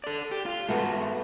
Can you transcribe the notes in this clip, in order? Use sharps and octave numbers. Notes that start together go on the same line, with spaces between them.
A4 D5
G4
F4
G#2 A3 B3 F#4